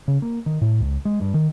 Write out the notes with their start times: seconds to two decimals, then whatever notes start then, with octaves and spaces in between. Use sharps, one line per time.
0.08 C#3
0.22 A#3
0.46 D#3
0.62 A2
0.80 C#2
1.05 G#3
1.21 G2
1.34 D#3